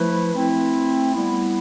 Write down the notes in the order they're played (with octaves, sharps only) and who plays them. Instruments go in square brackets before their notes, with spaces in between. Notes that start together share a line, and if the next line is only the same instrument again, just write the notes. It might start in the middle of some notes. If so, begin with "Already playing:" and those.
Already playing: [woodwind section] F3 A3 E4 B4
A3 C4 E4
G3 B3 E4